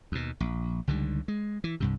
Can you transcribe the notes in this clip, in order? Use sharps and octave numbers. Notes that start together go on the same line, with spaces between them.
D#2 B2
A#1
C#2 D3 D#3 G3
G#3
E3
C2 G2 C3